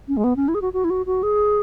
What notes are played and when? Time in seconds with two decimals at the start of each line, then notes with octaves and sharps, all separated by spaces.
0.08 C#4
0.17 G#3
0.24 B3
0.36 C#4
0.48 E4
0.55 G#4
0.62 F#4
0.73 F#4
0.84 E4
0.90 F#4
1.06 F#4
1.23 G#4